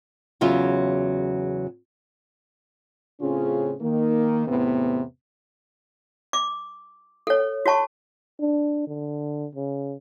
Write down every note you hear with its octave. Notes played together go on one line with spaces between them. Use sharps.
E2 C#3 F#3 F4 E5
A2 C#3 C4 C#4 F4 G#4
D#3 A#3
E2 A2 C3 B3
D6
A4 C#5
F#4 C#5 A5 C#6
D4
D3
C#3